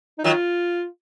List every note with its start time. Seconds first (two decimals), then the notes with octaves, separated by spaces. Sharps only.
0.18 D#4
0.24 D#3 F#3 F4